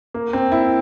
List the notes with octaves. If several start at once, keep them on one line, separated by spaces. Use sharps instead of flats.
A#3
C4
E4